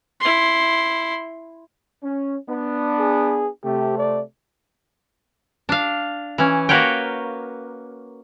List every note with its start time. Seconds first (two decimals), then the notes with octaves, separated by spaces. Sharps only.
0.20 E4 C6
2.03 C#4
2.48 B3 D4
2.99 G#4
3.64 C3 A3 G4
3.98 D5
5.69 D4 F5
6.38 E3 C#4
6.69 A#3 F#4 A#4 B4 C#5 G5